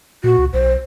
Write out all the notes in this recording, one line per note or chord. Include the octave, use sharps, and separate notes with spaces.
A#2 F#4
C#2
B1 C5